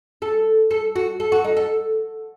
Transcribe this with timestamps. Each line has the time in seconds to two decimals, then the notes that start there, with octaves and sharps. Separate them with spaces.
0.22 A4
0.71 A4
0.96 F#4
1.20 A4
1.32 F#4
1.44 D#4
1.57 A4